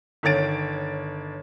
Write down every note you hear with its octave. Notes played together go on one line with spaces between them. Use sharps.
G1 D#3 C#5 A6 D7